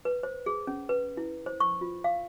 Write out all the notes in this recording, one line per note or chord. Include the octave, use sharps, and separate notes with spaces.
B4
C5
G#4
C#4
B4
E4
C5
C#6
F4
F5